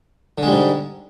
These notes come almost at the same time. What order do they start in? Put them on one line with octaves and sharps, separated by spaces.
D3 G#3 G3 G#2